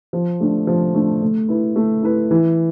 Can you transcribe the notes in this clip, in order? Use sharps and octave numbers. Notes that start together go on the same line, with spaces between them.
F3
A3 D4
F3
A3 D4
A3
E4 B4
A3
E4 B4
E3